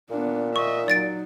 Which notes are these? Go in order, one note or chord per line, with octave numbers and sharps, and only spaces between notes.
A#2 B3 D4
D#5 E5 C#6
F#3 D#4 D5 A6 D7